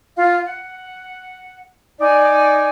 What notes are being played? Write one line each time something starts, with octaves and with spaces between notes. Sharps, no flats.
F4 F5
F#5
D#4 D5 G#5